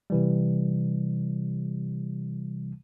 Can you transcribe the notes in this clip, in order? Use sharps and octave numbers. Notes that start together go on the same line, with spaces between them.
C3 E3 G3